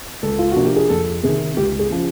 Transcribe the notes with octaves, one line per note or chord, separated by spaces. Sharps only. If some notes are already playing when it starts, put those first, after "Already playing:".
C#2 A4
F4
C3 F3 A#3 D4 F#4
G4
G#4
F2 A4
C3 D#3 G#4
C#2 G4
G#4
C#3 F3